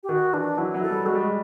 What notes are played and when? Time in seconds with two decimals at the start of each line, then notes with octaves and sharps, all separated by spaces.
0.03 G4
0.09 D#3 F#4
0.33 E3 D4
0.58 F#3 E4
0.74 F#3
0.82 A4
0.91 G3
1.06 G#3 F#4
1.14 G3
1.22 G#3